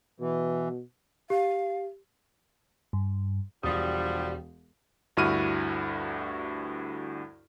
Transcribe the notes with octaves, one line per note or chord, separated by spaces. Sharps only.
B2 E3
G4 F5
G2
E1 D3 F3 G3 D#6
D2 G2 E4 F#4 F6 D#7